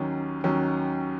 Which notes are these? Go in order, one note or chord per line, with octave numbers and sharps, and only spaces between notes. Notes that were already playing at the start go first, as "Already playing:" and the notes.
Already playing: D#2 D#3 F#3 C#4
D#2 D#3 F#3 C#4